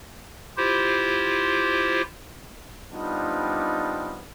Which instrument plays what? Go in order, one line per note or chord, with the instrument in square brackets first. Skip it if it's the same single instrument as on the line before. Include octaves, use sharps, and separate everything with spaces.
[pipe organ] E4 F4 G4 C5
[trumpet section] G3 B3 C4 D4 D#4 F4